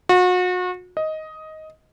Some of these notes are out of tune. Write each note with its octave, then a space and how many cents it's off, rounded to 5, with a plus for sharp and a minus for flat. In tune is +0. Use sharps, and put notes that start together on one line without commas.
F#4 -35
D#5 +10